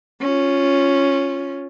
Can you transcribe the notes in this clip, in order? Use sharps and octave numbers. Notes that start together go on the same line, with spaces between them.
C#4 F4